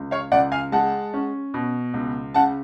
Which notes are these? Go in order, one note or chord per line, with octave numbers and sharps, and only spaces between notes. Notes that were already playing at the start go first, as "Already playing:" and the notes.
Already playing: C#2
C#5 F5
C#2 D5 F#5
F5 G#5
G#3 F#5 A5
C#4
B2
C#2
C#3 F#5 A5